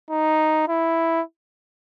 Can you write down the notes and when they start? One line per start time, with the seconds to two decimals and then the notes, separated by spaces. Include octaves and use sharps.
0.10 D#4
0.68 E4